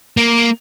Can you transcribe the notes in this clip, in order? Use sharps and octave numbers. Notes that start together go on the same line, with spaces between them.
A#3